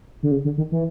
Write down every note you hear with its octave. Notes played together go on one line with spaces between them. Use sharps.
D3
C#3
D3
D#3
E3